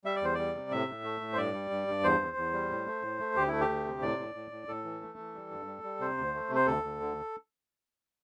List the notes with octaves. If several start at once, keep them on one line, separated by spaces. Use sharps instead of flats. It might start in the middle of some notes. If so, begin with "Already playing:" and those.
G3 E5
D5
E2 C5
G3 D5
C3
A2 E5
A2
A3
A2
C5
G2 D5
G3
G2
G2
E2 C5
E2
E2
G3
A2
A3
A2
A3
D2 G4
A3 E4
G4
D2
C3
A2 D5
A2
A2
A2
A2 A4
E3
A3
E3
G3
G2
G3
G3
C3 C5
D2
A3
C3
C5
D2 A4
D2
D3